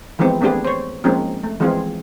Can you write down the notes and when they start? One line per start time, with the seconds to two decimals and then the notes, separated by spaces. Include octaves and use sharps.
0.19 E3 F3 G#3 B3 C4
0.41 A3 B3 C4 D4 G4 G#4
0.64 C5 C#5
1.04 F3 G#3 A#3 C4 C#4 D#4
1.43 A3
1.60 E3 F3 G#3 C4 F4 G#4